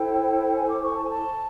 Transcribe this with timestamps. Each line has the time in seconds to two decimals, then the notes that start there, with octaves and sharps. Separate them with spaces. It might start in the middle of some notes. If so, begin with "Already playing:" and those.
Already playing: E4 A4 C5 G5
0.55 G#5
0.69 D6
0.83 C#6
0.91 G#5
0.96 A5
1.04 G#5
1.10 A5